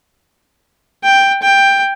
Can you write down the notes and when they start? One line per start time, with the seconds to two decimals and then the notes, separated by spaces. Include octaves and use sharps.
1.04 G5
1.43 G5